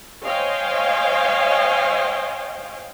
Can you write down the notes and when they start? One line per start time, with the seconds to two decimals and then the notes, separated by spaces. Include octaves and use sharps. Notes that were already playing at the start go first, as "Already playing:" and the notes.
0.23 C5 C#5 D#5 F5 G5 G#5